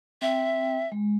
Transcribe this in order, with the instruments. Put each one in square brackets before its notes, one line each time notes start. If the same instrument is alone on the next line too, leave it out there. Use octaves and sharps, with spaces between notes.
[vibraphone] C4 G5 [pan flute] E5
[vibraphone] G#3